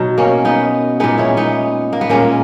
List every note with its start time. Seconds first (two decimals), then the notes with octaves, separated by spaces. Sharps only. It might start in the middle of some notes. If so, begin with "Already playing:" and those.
Already playing: B2 F#3 D#4
0.18 A#3 C#4
0.45 B3 D#4
1.00 A#2 G#3 B3 D#4
1.18 C#4 E4
1.37 B3 D#4
1.93 A#3
2.01 B3
2.09 A#2 G#3 A#3 C#4